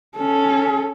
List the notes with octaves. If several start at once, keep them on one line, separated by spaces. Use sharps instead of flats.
C#4 A4